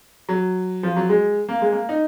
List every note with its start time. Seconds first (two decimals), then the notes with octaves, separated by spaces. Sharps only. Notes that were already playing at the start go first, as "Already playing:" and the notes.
0.29 F#3
0.83 F3
0.97 F#3
1.09 G#3
1.49 A#3
1.62 G#3
1.72 A#3
1.89 D#4